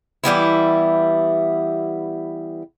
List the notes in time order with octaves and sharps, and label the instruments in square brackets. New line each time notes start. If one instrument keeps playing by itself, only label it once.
[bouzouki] E3 G3 B3 E4